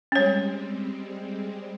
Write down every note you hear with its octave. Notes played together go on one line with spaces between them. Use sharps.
G3 G#3 C4 C#4 C#5